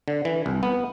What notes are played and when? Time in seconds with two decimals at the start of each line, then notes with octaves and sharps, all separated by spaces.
0.08 D3
0.25 E3
0.46 C2
0.63 B3